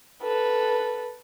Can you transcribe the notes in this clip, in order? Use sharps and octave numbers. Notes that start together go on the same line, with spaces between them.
A4 B4